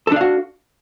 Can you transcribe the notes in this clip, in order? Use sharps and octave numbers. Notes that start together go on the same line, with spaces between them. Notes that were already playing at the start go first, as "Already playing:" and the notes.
D4 F#4 A4 F5